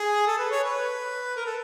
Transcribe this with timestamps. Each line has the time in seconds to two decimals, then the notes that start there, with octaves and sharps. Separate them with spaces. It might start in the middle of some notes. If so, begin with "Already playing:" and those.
Already playing: G#4
0.27 A4
0.39 B4
0.51 C#5
0.63 B4
1.36 A#4
1.46 A4